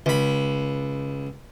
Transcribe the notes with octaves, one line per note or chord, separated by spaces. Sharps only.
C#2 B5